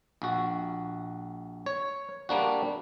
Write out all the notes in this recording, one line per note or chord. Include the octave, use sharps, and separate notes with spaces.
A#1 F#4
C#5
G3 A#3 D4 F#4